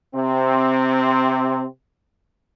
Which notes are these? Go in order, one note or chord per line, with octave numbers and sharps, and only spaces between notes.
C3 C4